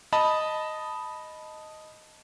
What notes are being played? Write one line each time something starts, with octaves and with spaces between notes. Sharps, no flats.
D#5 A5 B5